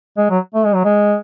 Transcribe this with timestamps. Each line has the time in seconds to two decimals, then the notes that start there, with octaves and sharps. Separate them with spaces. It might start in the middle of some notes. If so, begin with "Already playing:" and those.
0.17 G#3
0.30 F#3
0.54 A3
0.65 G#3
0.75 F#3
0.84 G#3